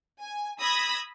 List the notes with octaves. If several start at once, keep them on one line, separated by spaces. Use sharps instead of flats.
G#5
B5 D#6 E6 G#6 A#6